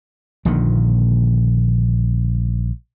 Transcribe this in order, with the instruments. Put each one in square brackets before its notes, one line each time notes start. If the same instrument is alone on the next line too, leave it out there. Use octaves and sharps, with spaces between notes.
[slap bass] A#1 A#2 D3 D#3